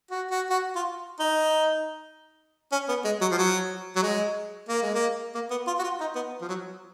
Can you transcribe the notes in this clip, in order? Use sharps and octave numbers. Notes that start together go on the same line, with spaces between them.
F#4
F#4
F#4
F4
D#4
C#4
B3
G#3
F#3
F3
F#3
F#3
G#3
A#3
G#3
A#3
A#3
B3
F4
F#4
F4
D#4
B3
F3
F#3